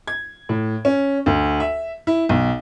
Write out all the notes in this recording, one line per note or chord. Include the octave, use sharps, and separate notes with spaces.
G#6
A2
C#4
D2
E5
E4
B1